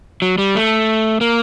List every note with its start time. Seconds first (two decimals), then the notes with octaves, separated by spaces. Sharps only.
0.22 F#3
0.38 G3
0.55 A3
1.21 A#3